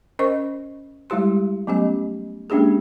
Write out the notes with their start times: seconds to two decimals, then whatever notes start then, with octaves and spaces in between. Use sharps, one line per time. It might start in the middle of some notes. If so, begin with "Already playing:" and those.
0.19 C#4 A#4 C5 D#5 C#6
1.10 G3 G#3 E4 G4 C6
1.67 F#3 A3 B3 C#4 G4 D#5
2.50 G#3 A#3 C#4 D4 G4 G#4